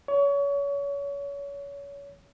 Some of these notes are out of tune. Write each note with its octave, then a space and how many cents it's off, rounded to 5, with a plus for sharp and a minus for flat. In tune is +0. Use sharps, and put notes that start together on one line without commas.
C#5 +30